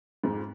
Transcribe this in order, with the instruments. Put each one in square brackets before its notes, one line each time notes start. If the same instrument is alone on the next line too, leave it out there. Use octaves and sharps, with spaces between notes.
[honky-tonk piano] F2 G#2